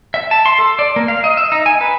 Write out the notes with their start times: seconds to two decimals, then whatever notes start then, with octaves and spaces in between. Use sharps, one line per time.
0.14 E5
0.31 A5
0.46 C6
0.59 A4
0.79 D5
0.96 A#3
1.08 F5
1.24 D#5
1.37 E5
1.52 D#4
1.66 G#5
1.81 B4